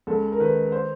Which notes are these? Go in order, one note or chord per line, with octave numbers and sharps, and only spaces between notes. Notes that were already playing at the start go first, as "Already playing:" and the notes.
C#2 A4
A#4
D#3 B4
C5